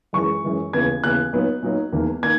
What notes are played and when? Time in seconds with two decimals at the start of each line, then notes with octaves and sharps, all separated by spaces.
0.13 F#2 E3 G#3 C#6
0.44 F#2 E3 G#3
0.73 D#2 C#3 E3 B3 G#6
1.03 D#2 C#3 E3 B3 F#6
1.33 A#2 F#3 B3 D#4
1.63 A#2 F#3 B3 D#4
1.92 E1 E2 D#3 A#3
2.23 D#3 A#3 G#6